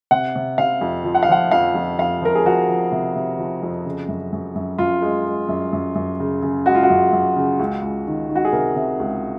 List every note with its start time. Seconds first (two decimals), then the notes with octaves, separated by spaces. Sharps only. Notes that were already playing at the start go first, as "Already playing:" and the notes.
0.11 C3 F#5
0.36 C3
0.58 C3 F5
0.81 F2
1.04 F3
1.15 F#5
1.23 F5
1.29 F3 F#5
1.51 F2 F5
1.75 F2
1.99 F2 F5
2.22 F3 A#4
2.35 G#4
2.45 F3 F#4
2.69 F3
2.92 C3
3.16 C3
3.39 F3
3.63 F2
3.85 C#3
4.08 F#2
4.33 F#2
4.55 F#2
4.78 F#2 F4
5.02 G#3
5.25 G#3
5.49 F#2
5.73 F#2
5.95 F#2
6.20 C#3
6.42 C#3
6.66 G#3 F#4
6.75 F4
6.83 F#4
6.90 F#2
7.12 F#2
7.36 C#3
7.59 C#2
7.82 C#2
8.07 D#3
8.29 D#3
8.36 F#4
8.45 G#4
8.52 C3 A#4
8.76 C3
9.00 C#2